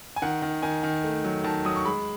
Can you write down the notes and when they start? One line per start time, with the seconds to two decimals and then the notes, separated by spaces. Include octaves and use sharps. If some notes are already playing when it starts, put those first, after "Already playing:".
0.16 G#5
0.22 D#3 F#5
0.42 D#3
0.62 D#3 G#5
0.83 D#3
1.04 A3
1.24 F#3
1.44 D#3 A5
1.65 F#3 D#6
1.76 C#6
1.85 G#3 B5